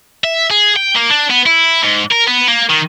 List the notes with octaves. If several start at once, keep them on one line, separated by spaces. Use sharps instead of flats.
E5
G#4
G5
A#3
D4
B3
E4
G#2
A#4
B3
A#3
D#3